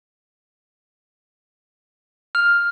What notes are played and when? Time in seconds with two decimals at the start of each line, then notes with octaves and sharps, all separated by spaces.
2.35 F6